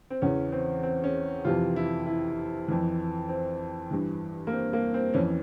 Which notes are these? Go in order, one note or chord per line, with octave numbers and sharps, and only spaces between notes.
C4
E2 C#3 E3 C#4
C4
C4
C#4
F2 C3 E3 F4
E4
E4
F2 E3
C4
G2 E3
A#3
C4
A#3
C4
F2 E3 C#4